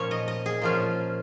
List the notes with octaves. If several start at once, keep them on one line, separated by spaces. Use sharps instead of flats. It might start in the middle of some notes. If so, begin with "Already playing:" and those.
Already playing: A#2 F3 C#4 C#5
D#5
D#5
G#4
A#2 F3 C#4 F4